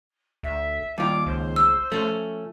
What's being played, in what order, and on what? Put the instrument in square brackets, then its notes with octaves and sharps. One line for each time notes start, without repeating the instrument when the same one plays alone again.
[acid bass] D2 [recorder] E5
[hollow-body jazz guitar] D#2 F4 [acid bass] G3 [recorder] D6
[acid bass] C#2 [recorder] C5
[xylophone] E6
[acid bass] F3 [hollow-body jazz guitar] A3 C#4